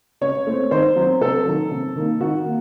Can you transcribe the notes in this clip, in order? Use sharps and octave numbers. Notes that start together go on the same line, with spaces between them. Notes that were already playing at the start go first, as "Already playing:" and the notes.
C#3 C#5
A3 C4
D#3 C5
F#3 C4
C3 A4
D#3 F#3
C3
D#3 A#3
D#3 F#4
A#3